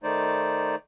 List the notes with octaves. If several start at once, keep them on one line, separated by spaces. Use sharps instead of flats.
D#3 A3 D#4 C5 D5